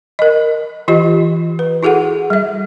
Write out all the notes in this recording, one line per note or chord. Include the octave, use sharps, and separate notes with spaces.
A#4 D#5
E3 F4 G4 D#5
B4
E4 F#4 G#4 A4 F#5
G3 E5